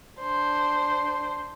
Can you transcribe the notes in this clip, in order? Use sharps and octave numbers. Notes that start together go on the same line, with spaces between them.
D4 C5